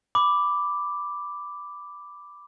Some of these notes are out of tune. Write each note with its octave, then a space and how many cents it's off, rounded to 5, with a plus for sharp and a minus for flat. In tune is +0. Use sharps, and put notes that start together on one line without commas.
B5 +5 D6 +0